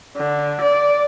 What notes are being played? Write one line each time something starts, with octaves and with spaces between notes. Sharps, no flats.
D3
D5